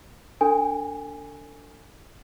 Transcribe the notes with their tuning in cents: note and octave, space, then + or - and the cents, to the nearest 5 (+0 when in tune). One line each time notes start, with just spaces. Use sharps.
D4 -20 A4 +35 G#5 +0